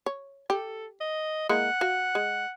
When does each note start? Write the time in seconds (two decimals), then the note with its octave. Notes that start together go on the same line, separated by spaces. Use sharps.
0.06 C#5
0.50 G4 A4
1.01 D#5
1.49 G#3 A#3 E4 F#5
1.81 F#4 F5
2.15 G#3